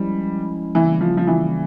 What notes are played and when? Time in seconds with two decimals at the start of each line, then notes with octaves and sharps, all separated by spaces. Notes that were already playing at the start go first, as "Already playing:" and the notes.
Already playing: F3 G3 G#3 C#4 E4
0.75 C#3 E3 G3 A#3 C#4
1.01 F3
1.17 F3
1.27 E3